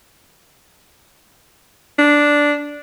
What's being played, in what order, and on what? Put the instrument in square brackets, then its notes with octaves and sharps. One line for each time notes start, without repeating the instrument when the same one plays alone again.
[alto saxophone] D4